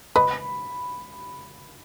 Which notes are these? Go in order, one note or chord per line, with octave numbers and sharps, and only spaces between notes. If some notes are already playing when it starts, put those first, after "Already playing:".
B4 D#5 B5